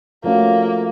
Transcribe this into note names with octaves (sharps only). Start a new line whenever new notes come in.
F3 A3 A#3 C#4 F#4